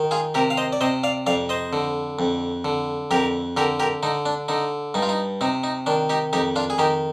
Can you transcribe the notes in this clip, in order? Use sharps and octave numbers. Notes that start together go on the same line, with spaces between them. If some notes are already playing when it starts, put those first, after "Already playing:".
Already playing: D#3
F4 G#4
C3 G4 A#4
F5
C5 D#5
D5
C3 C5 D#5
D5 F5
F2 D5 F5
C5 D#5
D3
F2
D3
F2 G4 A#4
D3 G4 A#4
G4 A#4
D3 D#4
D4
D3 D#4
G2 D#4
F4
D#4
C3 D#4
D#4
D#3 D4
D#4 G4
F2 D#4 G4
D4 F4
G#4
D#3 D#4 G4